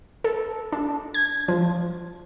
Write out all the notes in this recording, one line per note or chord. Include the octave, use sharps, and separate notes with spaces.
A4
D4
G#6
F3